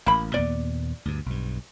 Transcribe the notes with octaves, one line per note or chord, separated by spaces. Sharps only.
A1 A#3 B5
D#2 A#2 B3 D5
D2 G2
B1 G2